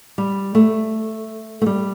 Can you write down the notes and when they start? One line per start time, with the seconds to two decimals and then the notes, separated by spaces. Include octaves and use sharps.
0.18 G3
0.55 A3
1.62 A3
1.66 G3